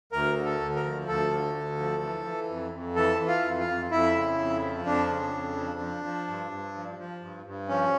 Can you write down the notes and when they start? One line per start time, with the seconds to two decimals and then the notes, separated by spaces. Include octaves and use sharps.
0.12 D2 A#4
0.37 D3
0.45 A4
0.60 D2
0.76 A#4
0.84 F3
1.07 D2 A4
1.32 D3
1.55 D2
1.78 F3
2.03 E3
2.25 E3
2.50 F2
2.73 F2
2.96 E3 A4
3.19 E3
3.27 F4
3.44 F2
3.59 F4
3.68 F2
3.91 F2 E4
4.15 C#3
4.38 F2
4.62 F3
4.85 F2 D4
5.09 C#3
5.33 F2
5.57 F3
5.80 F3
6.04 F3
6.27 G2
6.51 G2
6.75 F3
6.98 F3
7.21 G2
7.46 G2
7.69 F3 C#4